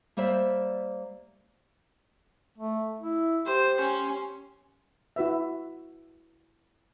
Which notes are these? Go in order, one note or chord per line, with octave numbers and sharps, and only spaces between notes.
G3 A#3 C5 D5 E5
A3
E4
G4 C5
C#4 C6
E4 F#4 B4 E5